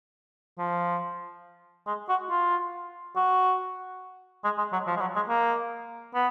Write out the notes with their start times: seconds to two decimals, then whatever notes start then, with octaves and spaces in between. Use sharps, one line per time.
0.58 F3
1.87 G#3
2.09 F#4
2.30 F4
3.16 F#4
4.44 G#3
4.58 G#3
4.73 F#3
4.87 F3
4.97 G#3
5.01 F#3
5.16 G#3
5.29 A#3
6.14 B3